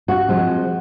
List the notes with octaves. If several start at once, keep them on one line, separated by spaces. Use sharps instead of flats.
F#4
F3 G#3 C4